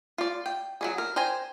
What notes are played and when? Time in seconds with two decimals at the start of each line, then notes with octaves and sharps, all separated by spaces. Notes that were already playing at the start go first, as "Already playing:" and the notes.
0.18 F4 D5
0.46 G5
0.81 F#3 G#3 G#4
0.98 A#4
1.16 C5 G5 G#5 A#5